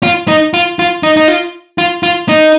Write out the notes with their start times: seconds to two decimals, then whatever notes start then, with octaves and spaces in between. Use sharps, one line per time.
0.03 F4
0.28 D#4
0.54 F4
0.79 F4
1.03 D#4
1.17 D#4
1.28 F4
1.78 F4
2.03 F4
2.29 D#4